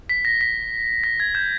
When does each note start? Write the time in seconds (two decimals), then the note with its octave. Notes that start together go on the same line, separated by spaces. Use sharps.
0.09 B6
0.25 A#6
0.41 B6
1.04 A#6
1.20 G#6
1.35 G6